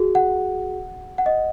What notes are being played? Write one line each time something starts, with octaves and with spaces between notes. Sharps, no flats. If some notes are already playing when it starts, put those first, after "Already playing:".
Already playing: F#4 G#4
F#5
F#5
D#5